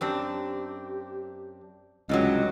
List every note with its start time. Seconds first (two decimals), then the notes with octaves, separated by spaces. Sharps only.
0.01 F#2 C4 D4 G4
2.09 C#2 G2 C3 F#3 D#5